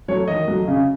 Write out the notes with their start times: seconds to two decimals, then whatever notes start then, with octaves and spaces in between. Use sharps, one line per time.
0.08 F#3 A3 C#5
0.28 D#3 D#5
0.47 F#3 A3
0.68 C#3